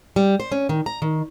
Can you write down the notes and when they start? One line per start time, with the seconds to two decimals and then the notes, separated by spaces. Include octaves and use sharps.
0.16 G3
0.40 C5
0.52 C#4
0.69 D#3
0.86 A#5
1.02 D#3